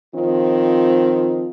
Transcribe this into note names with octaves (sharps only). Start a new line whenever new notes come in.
D#3 F3 C4 F4